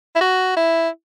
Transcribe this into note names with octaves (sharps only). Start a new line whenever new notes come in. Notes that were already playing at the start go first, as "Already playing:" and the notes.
E4
F#4
E4